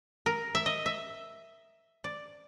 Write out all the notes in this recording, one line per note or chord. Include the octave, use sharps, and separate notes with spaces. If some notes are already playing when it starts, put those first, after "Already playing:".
A#4
E5
D#5
E5
D5